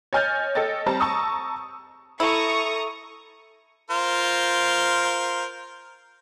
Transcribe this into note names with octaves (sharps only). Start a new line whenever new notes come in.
C#5 D#5 G#5 F6 G6 A6
A4 C#5 D#5 G5 A6
G3 C4 A5 A#5
A5 A#5 C#6 D#6 E6
E4 A4 A#5 C#6 D#6
F4 A#4 C5